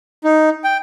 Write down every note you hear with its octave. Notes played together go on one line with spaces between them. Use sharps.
D#4
G5